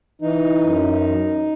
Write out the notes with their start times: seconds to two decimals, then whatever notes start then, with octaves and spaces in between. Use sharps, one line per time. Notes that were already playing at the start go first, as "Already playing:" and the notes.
0.22 E3 D#4
0.62 F#2